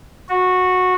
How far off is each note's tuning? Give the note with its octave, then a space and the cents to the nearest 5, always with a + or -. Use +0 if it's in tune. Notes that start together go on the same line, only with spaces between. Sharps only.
F#4 -15